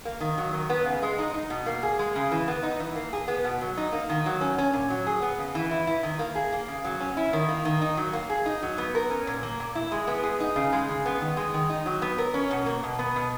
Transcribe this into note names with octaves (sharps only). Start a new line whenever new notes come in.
A#3
D#3
F#3
D#3
B3
C#3
G#3
D#4
D#4
B2
A#3
G#4
G#3
C#3
E3
B3
D#4
E3
A#3
G#4
B3
B2
F#3
D#4
A#3
D#3
F#3
C#4
C#4
A#2
F#3
G#4
B3
C#3
E3
E4
E4
D#3
A#3
G#4
A#3
C#3
F#3
C#4
E4
D#3
A#3
D#3
D#4
F#3
A#3
G#4
D#4
F#3
B3
A#4
C#4
A#2
A#3
A#2
E4
G#3
B3
G#4
D#4
C#3
G#3
C#3
B3
D#3
G#3
D#3
D#4
F#3
B3
A#4
C#4
B2
A#3
B2
B3
B2